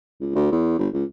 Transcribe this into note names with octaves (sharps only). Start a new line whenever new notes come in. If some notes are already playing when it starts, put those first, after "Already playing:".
C#2
D2
E2
G1
C#2